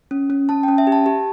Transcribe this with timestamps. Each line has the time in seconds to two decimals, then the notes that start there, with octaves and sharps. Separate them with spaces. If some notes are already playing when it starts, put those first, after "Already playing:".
0.11 C#4
0.30 C#4
0.49 C#4 A5
0.63 G5
0.68 C#4
0.78 E5
0.87 G4
0.92 A5
1.06 G4